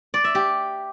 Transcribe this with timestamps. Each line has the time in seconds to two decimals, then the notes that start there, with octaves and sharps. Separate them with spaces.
0.14 D5
0.24 E5
0.35 G4